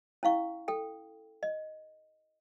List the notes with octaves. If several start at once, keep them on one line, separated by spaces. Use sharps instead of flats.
C#4 E4 F5 C#6
A4 G5
D#5